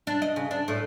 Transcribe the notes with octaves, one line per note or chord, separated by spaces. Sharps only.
D4
D#5
C#3
D4
A2